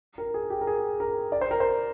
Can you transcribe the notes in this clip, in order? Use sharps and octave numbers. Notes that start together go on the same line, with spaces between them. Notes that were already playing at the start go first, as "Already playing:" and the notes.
A#4
G#4
G4
A#4
G#4
A#4
D5
C5
A#4
C5